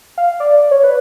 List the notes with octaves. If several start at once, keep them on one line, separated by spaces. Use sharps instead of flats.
F5
D5
C#5
B4